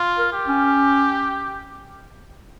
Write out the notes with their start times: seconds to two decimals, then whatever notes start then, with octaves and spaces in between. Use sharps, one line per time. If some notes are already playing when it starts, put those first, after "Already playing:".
Already playing: F4
0.18 A#4
0.33 G4
0.47 C#4